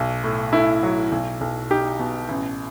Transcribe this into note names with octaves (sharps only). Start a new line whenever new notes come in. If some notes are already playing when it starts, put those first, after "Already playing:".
Already playing: B1
A2
A2 E4
F#3
B1
B1
D#4 G4
B2
A1